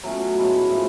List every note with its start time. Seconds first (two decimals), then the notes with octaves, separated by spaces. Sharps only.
0.03 B2 F#3 A3 C#4
0.37 A2 G#3 B3
0.70 A2 F3 A3